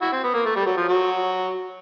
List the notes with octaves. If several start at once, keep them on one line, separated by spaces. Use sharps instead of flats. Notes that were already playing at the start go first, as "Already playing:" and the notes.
E4 F#4
C4
B3
A#3
A3
G3
F#3
F3
F#3